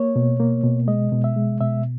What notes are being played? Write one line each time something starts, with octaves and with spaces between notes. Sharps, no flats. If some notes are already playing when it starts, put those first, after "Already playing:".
Already playing: A#3 C#5
B2
A#3
B2
G#3 D#5
B2
E5
G#3
B2 E5